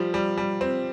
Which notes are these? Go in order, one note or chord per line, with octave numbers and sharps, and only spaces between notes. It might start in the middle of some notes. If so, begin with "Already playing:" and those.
Already playing: F3 G3
G3
G3
C4